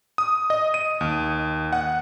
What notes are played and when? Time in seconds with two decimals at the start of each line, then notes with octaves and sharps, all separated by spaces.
0.18 D#6
0.50 D#5
0.74 D#7
1.01 D#2
1.73 F#5